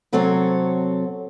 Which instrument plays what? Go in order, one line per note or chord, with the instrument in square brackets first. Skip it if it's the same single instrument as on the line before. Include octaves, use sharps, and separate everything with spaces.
[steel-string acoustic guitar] C3 F#3 C4 A4 C#5